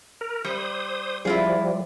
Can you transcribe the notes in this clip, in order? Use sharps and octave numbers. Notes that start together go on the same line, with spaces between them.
A#4
G3 C5 D#6
F3 G3 E4 F4 G#4